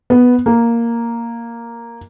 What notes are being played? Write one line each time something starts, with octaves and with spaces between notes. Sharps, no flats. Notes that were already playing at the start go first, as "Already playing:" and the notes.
B3
A#3